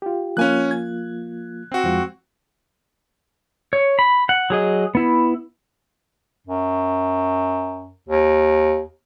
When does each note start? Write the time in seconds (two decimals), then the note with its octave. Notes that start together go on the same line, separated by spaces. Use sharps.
0.02 F4 G4
0.37 F3 A#3 C#4 F4 G#5 F#6
0.71 G#6
1.72 C4 F#4
1.84 F2 F3 G#3
3.73 C#5
3.99 B5
4.29 F#5
4.50 F#3 G#4 D#5
4.95 B3 E4
6.47 F#2
8.09 D#2